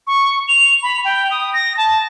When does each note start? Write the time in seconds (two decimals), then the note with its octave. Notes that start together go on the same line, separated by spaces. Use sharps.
0.07 C#6
0.48 F7
0.83 B5
1.05 G5
1.31 D#6
1.54 A#6
1.77 A5